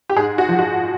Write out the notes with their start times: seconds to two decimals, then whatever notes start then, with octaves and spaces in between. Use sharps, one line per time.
0.10 G4
0.16 G#2 G#4
0.38 F#4
0.49 F3
0.59 F#4